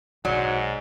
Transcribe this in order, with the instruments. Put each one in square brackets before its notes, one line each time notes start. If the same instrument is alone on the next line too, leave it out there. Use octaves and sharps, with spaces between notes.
[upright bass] B1 [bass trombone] G#2 [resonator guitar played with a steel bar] F#3 [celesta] D5 C#7